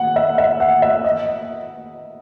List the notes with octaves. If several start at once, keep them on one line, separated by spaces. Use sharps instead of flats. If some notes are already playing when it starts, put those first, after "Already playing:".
Already playing: F#5
E5
E5
F#5
E5
D#5